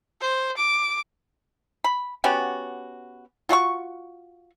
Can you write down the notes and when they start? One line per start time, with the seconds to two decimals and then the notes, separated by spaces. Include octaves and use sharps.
0.21 C5
0.57 D6
1.84 B5
2.24 B3 C#4 F#4 G4
3.49 F4 F#4 D#5 C#6